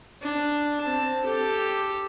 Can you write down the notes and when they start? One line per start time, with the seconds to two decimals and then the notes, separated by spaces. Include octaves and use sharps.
0.22 D4
0.81 C4 A5
1.24 G4 A4